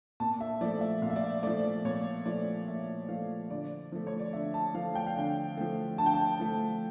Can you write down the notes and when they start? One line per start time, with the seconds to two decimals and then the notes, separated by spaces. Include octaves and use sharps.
0.20 A#2 A5
0.41 E5
0.61 F3 D5
0.64 A3
0.81 E5
1.02 A#2 F5
1.10 E5
1.16 D5
1.24 E5
1.43 F3 A3 D5
1.85 A#2 C#5
2.26 F3 A3 D5
2.67 A#2 E5
3.08 F3 A3 F5
3.50 D3 D5
3.92 F3 A3
4.07 C#5
4.20 D5
4.33 D3 E5
4.54 A5
4.74 F3 A3 F5
4.95 G5
5.07 F5
5.16 D3 G5
5.57 F3 A3
5.98 D3 A5
6.06 G5
6.14 A5
6.39 F3 A3